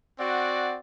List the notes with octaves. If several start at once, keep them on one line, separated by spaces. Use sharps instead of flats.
C4 F#4 D5 F#5